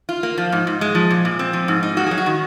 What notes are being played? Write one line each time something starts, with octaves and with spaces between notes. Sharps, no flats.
F4
A#3
F3
G#2
G#2
G#3
F3
A#2
A#2
C4
F3
G#2
D#4
A#3 F#4
F#3 G#4
F#4
D#3